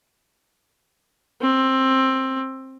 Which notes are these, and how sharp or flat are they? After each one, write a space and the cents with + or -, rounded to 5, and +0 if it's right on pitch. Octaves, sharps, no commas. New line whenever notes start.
C4 +15